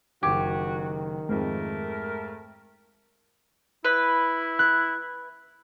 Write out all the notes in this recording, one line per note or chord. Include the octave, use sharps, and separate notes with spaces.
F#1 D#3 F#4 G4 G#6
F2 G#2 A3 A#4
E4 B4
F#6